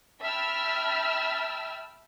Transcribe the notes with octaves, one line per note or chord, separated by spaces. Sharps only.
E5 G5 A5 B5 E6 F6